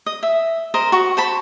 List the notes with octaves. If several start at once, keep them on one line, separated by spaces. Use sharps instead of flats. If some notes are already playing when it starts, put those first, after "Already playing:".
D#5
E5
A#4 C5 D#5
F#4 C#6
C5 A5 B5